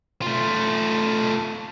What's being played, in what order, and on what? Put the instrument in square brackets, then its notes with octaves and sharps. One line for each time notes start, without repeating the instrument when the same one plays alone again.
[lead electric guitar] A3 F4